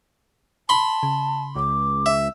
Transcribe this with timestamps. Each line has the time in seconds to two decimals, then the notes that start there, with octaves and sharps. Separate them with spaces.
0.69 A5 B5 C6
1.03 C#3
1.55 C#2 D6
2.06 E5